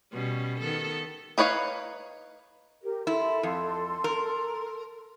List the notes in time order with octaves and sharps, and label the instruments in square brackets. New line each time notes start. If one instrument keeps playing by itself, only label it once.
[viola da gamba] B2 G3 C#4
D#3 B3 A4
[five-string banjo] D#4 B4 C#5 D5 F5
[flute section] G4 A#4
[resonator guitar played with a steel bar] E4 [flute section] A4 C6
[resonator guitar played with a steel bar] F2
A#4